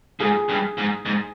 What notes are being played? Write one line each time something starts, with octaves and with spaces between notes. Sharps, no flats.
G#2 G#4
G2
G#2
G#2